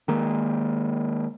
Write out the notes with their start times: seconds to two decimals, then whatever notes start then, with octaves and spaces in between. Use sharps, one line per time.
0.08 D#3 G#3 A#3